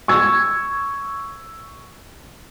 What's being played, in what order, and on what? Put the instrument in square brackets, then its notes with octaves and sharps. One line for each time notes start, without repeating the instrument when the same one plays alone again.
[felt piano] C#6 E6 G#6